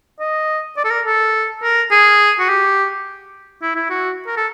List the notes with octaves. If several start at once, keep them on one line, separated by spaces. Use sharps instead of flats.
D#5
D5
A4
A#4
A4
A#4
G#4
F#4
G4
E4
E4
F#4
A#4
A4